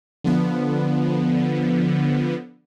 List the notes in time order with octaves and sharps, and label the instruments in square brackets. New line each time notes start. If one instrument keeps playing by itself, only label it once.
[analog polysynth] D3 F3 B3